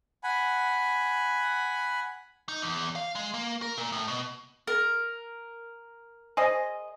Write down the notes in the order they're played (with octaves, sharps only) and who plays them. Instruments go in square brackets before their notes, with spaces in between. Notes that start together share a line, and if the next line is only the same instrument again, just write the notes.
[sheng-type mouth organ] F#5 G#5 B5
[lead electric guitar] D#4
E2
F5
G#3
A#3
A#4
A#2
A2
B2
[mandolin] A#4
[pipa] G#4 C5 D#5